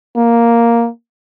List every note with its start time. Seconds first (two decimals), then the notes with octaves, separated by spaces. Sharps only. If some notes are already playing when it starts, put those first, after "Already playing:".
0.17 A#3